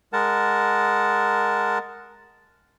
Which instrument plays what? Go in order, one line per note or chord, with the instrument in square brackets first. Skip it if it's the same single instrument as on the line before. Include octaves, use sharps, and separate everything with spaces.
[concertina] G#3 A#4 F#5 A5